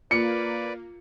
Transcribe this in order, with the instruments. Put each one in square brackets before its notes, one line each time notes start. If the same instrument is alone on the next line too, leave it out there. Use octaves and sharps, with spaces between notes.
[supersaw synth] A#3 [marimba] F4 [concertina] B4 D5 [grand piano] C#7